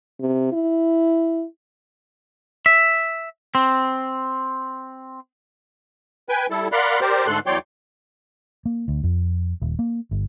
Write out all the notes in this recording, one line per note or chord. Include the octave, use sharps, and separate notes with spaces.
C3
E4
E5
C4
B4 G5 G#5
G3 E4 A4
A#4 D5 F5 F#5 B5 C6
G4 A#4 C5 D5
G#2 D3 A3 A4 C6 F#6
E2 F#3 C#5 D5 G5 C6
A#3
D2
F2
D#1
A#3
G1